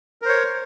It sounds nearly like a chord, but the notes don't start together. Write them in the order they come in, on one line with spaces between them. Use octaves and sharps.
A#4 C5 C#5